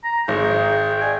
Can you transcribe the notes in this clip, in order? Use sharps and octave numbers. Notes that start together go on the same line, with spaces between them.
A#5
G#1 G#4 G5
D5 G#5